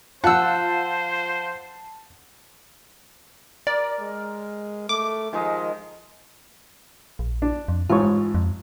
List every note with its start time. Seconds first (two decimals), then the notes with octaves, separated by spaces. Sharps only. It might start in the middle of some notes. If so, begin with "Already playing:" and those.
0.24 F3 F4 C5 F#5 A5 E6
3.67 A#4 D5
4.00 G#3
4.89 A3 D6
5.33 D#3 F3 G#3 D#5
7.19 A#1
7.42 D4
7.68 F2
7.90 A1 G#2 F4 C#5
8.35 F2